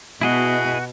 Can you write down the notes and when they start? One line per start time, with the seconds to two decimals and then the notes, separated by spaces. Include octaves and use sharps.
0.21 B2 E4 F#4 G#4 D#5